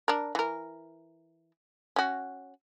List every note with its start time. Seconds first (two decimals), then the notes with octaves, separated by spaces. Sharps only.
0.08 D4 A#4
0.35 E3 A#4
1.96 C#4 F#4